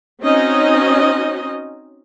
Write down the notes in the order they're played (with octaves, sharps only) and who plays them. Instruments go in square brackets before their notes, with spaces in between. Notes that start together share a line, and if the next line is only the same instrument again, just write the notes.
[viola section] C4 C#4 D#4 F#4 D#5